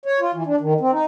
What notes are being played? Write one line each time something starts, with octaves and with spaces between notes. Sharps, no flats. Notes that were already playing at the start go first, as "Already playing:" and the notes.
C#5
F4
E3
D4
D#3
C4
D#4